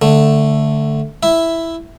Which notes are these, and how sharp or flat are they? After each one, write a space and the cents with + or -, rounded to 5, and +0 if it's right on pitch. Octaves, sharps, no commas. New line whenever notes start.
D3 +0 A3 +5
E4 +0 E5 +0